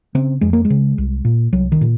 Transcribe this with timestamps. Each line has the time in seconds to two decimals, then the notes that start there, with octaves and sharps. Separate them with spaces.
0.15 C#3 C4
0.41 F2 G#3
0.53 A#3
0.65 G#3
0.70 C#3
0.98 C2
1.25 A#2
1.53 C2 F#3
1.72 D#3
1.81 A#2